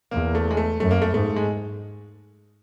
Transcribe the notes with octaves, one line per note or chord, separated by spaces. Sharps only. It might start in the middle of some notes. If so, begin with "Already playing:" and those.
E2 A#3
A3
G#3
A3
F#2 A3
A#3
A3
G#2 A3
G#3